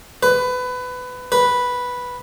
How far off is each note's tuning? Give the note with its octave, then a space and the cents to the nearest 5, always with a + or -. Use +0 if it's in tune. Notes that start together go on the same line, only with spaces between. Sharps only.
B4 +20
B4 -5